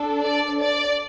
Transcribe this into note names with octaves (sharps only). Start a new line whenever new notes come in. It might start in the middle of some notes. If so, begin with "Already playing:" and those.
Already playing: D4 A4
D5
D5